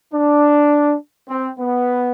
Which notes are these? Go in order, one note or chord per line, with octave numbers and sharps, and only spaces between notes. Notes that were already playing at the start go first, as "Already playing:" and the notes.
D4
C4
B3